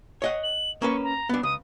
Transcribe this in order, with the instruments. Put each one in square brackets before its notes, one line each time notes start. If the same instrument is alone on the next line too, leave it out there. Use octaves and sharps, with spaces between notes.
[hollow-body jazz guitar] C#5 D#5 F#5
[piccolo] F#7
[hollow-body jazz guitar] A#3 C#4 B4 [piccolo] C#6
[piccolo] A#5
[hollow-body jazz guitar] B3 D4
[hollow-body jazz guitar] C#2 [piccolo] D#6